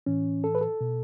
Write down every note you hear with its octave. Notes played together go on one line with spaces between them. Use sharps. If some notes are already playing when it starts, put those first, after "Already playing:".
A2 E3 C#4
A4
B4
A4
B2